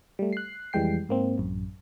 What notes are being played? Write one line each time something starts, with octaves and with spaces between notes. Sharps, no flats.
G3 A3
F#6 C7
F2 E3 G3 G#3 G5 C7
G#2 A#3 C4
A1 F#2